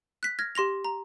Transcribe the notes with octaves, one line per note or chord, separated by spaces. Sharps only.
F#6 B6
F6 G#6 A#6
G4 C6 A#6 F7
A#5